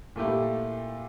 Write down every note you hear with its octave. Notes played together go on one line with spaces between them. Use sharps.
A#2 A3 E4 G4